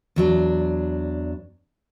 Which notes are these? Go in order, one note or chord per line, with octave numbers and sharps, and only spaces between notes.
E2 F#3 D4